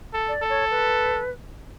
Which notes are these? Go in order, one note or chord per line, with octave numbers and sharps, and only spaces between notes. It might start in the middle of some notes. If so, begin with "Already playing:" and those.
A4
D5
A4
C#5
B4